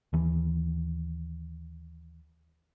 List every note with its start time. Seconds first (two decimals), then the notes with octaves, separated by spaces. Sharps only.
0.13 D#2 E3